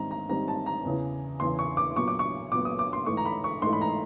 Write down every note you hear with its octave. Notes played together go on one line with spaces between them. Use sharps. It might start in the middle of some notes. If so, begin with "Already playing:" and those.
Already playing: G#2 D#3 G3 C4 A#5
A#5
G#2 D#3 G3 C4 A#5
A5
A#5
E2 C#3 E3
E2 C#3 E3 C6
C#6
D6
A#2 F#3 B3 C#6
D6
C#6
A#2 F#3 B3 D6
D#6
D6
C6
G#2 E3 A3 C#6
A#5
B5
C#6
G#2 E3 A3 C6
B5
A#5